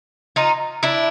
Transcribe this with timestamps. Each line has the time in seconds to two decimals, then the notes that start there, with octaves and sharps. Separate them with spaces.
0.36 D#4 F4
0.83 D4 E4